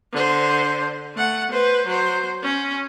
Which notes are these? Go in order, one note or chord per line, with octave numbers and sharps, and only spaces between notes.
D3 C5
A3 F#5
B4 C5
F#3 C5
C#4